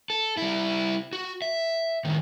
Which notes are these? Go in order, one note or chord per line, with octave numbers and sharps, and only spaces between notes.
A4
G3 E4
F#4
E5
A2 D#3